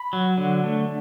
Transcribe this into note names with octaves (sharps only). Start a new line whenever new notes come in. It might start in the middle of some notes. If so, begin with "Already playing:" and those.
Already playing: B5
F#3
D3
A3